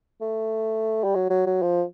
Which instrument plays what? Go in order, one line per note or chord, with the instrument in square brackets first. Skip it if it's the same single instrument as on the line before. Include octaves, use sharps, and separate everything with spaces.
[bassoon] A3
G3
F#3
F#3
F#3
F3